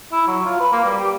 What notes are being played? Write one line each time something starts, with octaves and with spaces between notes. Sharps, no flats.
E4
F#3
F4
B4
A#3
G3
G4